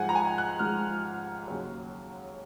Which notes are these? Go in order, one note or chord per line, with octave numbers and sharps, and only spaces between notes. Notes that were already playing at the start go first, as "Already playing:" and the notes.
Already playing: G#2 F3 G#3 F#5 G#5
A#5
G#5
F#6
G#2 F3 G#3 F6
D#2 C#3 F#3